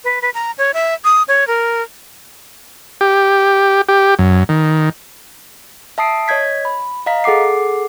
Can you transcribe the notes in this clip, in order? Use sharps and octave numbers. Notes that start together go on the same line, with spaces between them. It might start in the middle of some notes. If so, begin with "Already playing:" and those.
B4
B4
A#5
C#5
E5
D#6
C#5
A#4
G4
G4
F#2
D#3
E5 A5 D#6 C7 D7
C#5 D#5 G6 G#6 B6
B5
D#5 F5 A#5 B6
G#4 A4 F#5 D6 C7